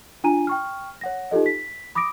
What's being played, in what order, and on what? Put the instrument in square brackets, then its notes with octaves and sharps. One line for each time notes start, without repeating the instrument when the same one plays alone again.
[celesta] D4 F4 G#5 A#5 D#7
G5 C#6 F6
C#5 F#5 A#6
D#4 F4 G4 A4 D#5
B6
B5 D6 D#6 A#6 D7